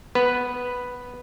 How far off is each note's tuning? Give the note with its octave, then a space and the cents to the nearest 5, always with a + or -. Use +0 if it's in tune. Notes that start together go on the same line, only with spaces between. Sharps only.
B3 +0 B4 +0